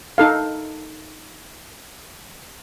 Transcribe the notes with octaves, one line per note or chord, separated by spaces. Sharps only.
D#4 A4 F5